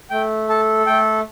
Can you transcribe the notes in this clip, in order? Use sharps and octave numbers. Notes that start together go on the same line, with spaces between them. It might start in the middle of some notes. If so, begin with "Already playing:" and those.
A3 G5
A4 A5
A3 G5